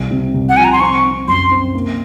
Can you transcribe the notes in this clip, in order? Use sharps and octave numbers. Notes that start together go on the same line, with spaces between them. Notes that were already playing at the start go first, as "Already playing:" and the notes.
Already playing: C2
C3
C2
F#5
F3 G#5
A#5
C6
C4 C#6
C4
F#2 C6
C4
A#3